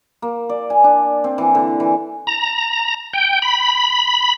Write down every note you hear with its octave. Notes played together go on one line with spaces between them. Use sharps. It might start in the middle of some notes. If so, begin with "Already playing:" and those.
A#3
D5
G#5
D4
C4
E3
D3
E3
A#5
G5
B5